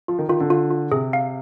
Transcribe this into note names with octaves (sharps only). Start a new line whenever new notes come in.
F3 F4
D#3
D#3 F4
D3
F4
F4
C3 G#4
F5